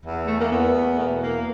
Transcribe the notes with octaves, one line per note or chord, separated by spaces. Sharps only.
E2
A3
A#3
E2 B3
A3
B2 A#3
A#3